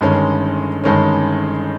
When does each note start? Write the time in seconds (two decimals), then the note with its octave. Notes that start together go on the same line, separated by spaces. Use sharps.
0.01 G1 G2 D#3 G#3 C#4
0.84 G1 G2 D#3 G#3 C#4